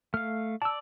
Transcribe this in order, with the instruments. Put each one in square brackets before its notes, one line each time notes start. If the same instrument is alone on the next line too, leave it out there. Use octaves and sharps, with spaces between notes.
[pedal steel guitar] A3 F5 [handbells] F6
[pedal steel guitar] D5 [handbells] A5 E6